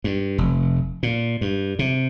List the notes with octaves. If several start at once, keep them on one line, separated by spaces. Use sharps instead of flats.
G2
F1
A#2
G2
C3